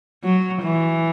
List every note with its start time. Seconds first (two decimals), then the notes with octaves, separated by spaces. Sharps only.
0.24 F#3
0.63 E3